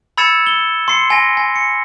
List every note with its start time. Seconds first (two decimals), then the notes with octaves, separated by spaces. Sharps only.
0.18 B5 E6 G#6 A6 C#7 E7
0.47 G7
0.88 C6 C7 C#7
1.10 G#5 A#6
1.37 G#5
1.56 C#7